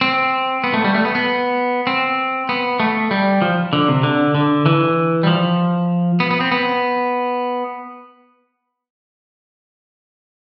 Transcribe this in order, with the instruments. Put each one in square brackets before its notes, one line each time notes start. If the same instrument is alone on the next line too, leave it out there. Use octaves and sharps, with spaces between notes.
[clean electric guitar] C4
B3
A3
G3
A3
B3
B3
C4
B3
A3
G3
F3
D3
C3
D3
D3
E3
G3
F3
B3
B3
C4
B3